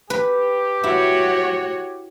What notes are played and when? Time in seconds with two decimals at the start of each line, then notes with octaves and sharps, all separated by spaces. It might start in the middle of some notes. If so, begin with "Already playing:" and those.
0.10 G4 B4
0.84 E4 F#4 C#5